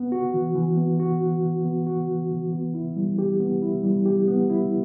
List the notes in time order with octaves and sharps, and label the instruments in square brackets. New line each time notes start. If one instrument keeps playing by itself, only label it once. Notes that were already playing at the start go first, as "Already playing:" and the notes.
Already playing: [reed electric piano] B3
F#4
E3
E3
B3
F#4
E3
E3
B3
F#4
E3
E3
B3
E4
G3
G4
B3
E4
G3
G4
B3
E4